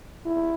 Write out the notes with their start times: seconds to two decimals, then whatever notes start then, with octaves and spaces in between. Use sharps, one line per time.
0.25 E4